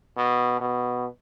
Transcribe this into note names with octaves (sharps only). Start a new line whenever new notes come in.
B2
B2